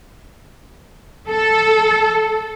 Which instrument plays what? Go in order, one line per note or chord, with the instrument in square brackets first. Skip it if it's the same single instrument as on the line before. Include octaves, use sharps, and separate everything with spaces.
[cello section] A4